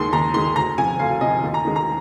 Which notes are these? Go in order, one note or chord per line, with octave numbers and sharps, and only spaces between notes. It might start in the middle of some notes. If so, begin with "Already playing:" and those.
Already playing: D#2 D#3 G#3 C6
D#2 A#5
D#3 G#3 C6
D2 A#5
C3 F3 G#5
D2 F5
C3 F3 D#5
D#2
A#5
D#3 G#3
A#5